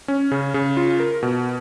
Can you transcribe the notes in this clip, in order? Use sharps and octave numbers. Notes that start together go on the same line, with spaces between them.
C#4
C#3
C#3
F4
A#4
B2